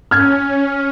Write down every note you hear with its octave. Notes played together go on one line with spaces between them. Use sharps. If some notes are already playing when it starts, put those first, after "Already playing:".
C#4 F6 G#6